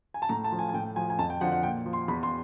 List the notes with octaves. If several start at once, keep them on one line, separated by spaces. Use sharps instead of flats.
G#5
A5
A2 A#5
A5
F3
G#5
G#5
A2 G5
F3 G#5
G#5
F2 A5
G5
D3 F3 F#5
F#5
A#2 G5
F3
C6
E2 B5
C6